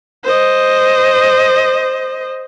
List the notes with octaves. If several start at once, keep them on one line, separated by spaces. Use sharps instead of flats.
C5 D#5